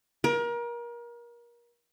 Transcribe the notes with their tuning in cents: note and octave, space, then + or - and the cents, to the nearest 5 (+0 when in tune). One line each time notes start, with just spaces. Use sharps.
A#4 +30